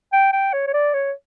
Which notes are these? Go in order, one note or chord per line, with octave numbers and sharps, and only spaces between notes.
G5
G5
C#5
C#5
D5
C#5